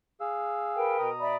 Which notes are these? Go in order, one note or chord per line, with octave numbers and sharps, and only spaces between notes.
G#4 F5 E6
A#4 B4 G5
B2 A#5 D#6
D5 E5 B5